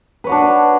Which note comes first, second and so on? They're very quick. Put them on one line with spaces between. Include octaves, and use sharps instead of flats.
B4 C#5 F#4 D4